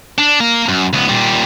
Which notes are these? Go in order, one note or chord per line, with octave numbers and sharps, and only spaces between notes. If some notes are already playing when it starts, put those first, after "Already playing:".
D4
A#3 A#4
F#2
C#2 B3
A#2 G3